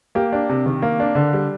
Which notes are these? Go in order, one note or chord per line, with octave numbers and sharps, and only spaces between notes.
A#3 G4
D4
C3
D#3
A#3
D4
D3
G3